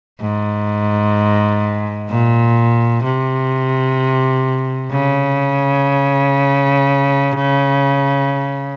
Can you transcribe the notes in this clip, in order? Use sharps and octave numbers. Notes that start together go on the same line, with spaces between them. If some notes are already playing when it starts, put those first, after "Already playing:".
G#2
A#2
C3
C#3